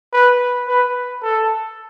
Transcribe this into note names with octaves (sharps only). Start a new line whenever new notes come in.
B4
B4
A4